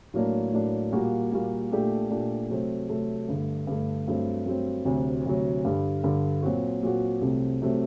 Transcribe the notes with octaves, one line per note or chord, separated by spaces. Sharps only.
A2 F#3 A#3 D4
A2 F#3 A#3 D4
A#2 G3 A#3 F#4
A#2 G3 A#3 F#4
A#2 A3 D4 G4
A#2 A3 D4 G4
C3 F#3 A3 C4
C3 F#3 A3 C4
G2 D3 A3
G2 D3 A3
G2 F#3 A3 C4
G2 F#3 A3 C4
D2 C3 F#3
D2 C3 F#3
G2 D3 G3
G2 D3 G3
A#2 F#3 C4 F#4
A#2 F#3 C4 F#4
C2 C3 F#3 A3 C4
C3 F#3 A3 C4